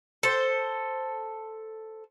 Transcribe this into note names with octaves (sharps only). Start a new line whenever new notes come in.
A4 C5